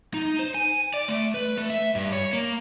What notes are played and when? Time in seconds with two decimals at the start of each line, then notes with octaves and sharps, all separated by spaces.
0.14 D#4
0.39 C5
0.54 G#5
0.94 D5
1.08 A3
1.34 B4
1.58 A3
1.70 E5
1.95 G2
2.12 C#5
2.33 A#3